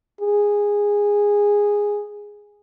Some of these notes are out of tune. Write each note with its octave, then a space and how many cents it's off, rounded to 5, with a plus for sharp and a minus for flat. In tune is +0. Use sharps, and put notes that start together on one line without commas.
G#4 -10